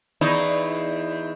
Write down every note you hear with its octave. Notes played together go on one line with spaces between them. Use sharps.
E2 D#4 E4